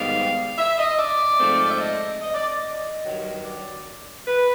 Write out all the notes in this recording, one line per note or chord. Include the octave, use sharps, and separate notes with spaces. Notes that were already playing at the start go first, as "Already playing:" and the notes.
Already playing: G#2 D#3 G3 B3 F5
E5
D#5
D5
G#2 F3 A3 C4
E5
D#5
D#5
D5
D#5
G2 D#3 F#3
D5
B4